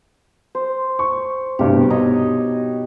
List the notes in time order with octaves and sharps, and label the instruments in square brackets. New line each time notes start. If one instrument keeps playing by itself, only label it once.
[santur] C5
[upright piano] C#6
[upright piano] C2 G2 B2 [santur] G4
[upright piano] B2 [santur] D#4 C#5 D#5